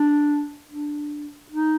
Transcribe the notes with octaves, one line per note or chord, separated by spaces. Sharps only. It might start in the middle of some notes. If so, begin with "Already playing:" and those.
Already playing: D4
D4
D#4